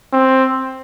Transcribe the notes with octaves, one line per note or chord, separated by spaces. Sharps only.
C4